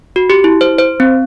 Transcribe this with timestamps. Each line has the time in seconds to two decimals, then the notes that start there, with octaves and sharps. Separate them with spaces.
0.16 F#4
0.30 G4
0.44 E4
0.61 C5
0.79 C5
1.00 C4